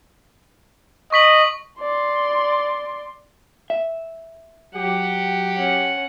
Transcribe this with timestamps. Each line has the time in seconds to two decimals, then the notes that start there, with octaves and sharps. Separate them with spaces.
1.12 D#5 C#6 B6 F#7
1.80 D5 C6
3.70 E5
4.75 F#3 G4 F#5
5.57 C#4 F#5